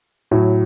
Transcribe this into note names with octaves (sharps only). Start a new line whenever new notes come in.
A2 F#3